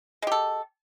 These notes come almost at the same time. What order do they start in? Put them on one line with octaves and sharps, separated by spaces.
G#3 G4 A4